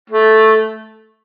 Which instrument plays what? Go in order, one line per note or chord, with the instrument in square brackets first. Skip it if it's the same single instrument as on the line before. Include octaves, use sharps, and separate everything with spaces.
[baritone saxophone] A3